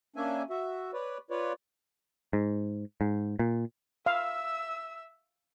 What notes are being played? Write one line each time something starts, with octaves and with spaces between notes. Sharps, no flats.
A#3 C#4 D4 E5 G#5
F#4 E5
B4 C#5 D5
F4 B4 C#5 D5
G#2
G#2
A#2
E5 F5 E6